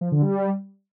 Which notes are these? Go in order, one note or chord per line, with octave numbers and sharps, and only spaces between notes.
F3
D3
G3